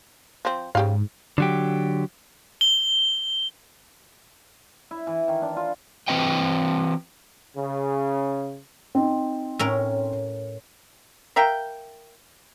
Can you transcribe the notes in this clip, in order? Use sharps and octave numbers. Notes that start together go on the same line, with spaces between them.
F3 C4
G#2 C#3 G4 F5
D3 F#3 G4
G7
E4
E3
D#3
D4
F4
E3 C4 B4 D#5 G5
C#3
C4 D#4
A2 C#4 A#4
A#4 E5 F5 G5